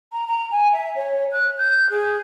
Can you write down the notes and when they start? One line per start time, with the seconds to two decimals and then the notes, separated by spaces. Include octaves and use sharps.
0.12 A#5
0.27 A#5
0.51 G#5
0.72 E5
0.96 C#5
1.32 F#6
1.58 G6
1.90 G#4